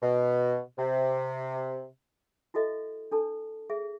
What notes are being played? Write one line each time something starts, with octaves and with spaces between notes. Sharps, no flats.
B2
C3
E4 F#4 A4 D#5 E5
D4 A4 A5
G#4 E5